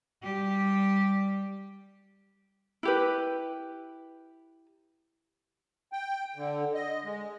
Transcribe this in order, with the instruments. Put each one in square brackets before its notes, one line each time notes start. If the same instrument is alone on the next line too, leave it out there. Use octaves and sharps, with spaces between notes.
[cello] G3 G4
[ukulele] E4 G4 B4
[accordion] G5
D3
D#5
G#3